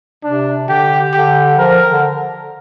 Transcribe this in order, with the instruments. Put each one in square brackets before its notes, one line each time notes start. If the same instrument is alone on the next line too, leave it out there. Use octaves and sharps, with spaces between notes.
[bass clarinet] C3 [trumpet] D4
[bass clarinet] D3 [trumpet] G4
[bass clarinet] D3 [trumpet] G4
[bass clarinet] F3 [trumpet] A#4
[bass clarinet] D3